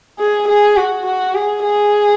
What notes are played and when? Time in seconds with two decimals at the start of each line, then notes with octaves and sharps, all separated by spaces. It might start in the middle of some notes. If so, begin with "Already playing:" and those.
0.19 G#4
0.48 G#4
0.77 F#4
1.06 F#4
1.35 G#4
1.63 G#4